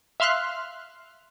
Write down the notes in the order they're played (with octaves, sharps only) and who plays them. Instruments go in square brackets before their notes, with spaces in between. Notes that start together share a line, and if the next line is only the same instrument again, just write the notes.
[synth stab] E5 F5 C6 F6 F#6